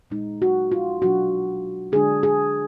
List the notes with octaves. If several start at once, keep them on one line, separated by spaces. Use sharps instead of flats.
A#2 G#3 D#4
F#4
F4
B2 F#3 D4 F#4
D3 G#3 D4 G#4
G#4